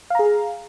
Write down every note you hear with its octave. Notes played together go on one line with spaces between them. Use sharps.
G#4 F5 A#5